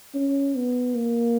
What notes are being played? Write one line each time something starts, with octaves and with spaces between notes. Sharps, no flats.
C#4
B3
A#3